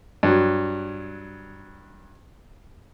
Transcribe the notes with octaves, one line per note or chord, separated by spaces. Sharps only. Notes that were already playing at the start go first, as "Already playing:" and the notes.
G2 F#3